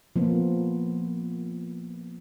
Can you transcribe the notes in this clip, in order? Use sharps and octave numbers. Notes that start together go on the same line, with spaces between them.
F3 A#3 B3 F4